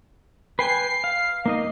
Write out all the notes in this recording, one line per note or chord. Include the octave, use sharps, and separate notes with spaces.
B4 G5 G#5 C7
F5
A#3 D#4 D#5